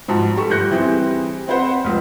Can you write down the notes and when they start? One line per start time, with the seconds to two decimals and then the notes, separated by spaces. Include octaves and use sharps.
0.08 G#2 F3 F#4 A5
0.37 G3 A4 C#6
0.50 G1 F#6 G6 A#6 C#7
0.71 E3 G3 C4 G#4
1.48 C4 B4 C5 F#5
1.85 F1 C#2